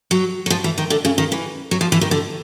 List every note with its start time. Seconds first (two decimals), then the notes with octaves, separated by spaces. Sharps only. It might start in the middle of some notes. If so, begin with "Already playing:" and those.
0.11 F#3
0.46 F#3
0.50 F3
0.64 E3
0.78 D#3
0.90 D3
1.05 C#3
1.18 D#3
1.32 E3
1.71 F#3
1.81 F3
1.92 E3
2.01 D#3
2.11 D3